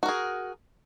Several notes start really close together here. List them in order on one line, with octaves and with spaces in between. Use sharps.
F#4 A#4 G#4